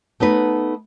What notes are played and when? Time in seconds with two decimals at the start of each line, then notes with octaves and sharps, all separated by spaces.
0.20 A3 B3 D#4 B4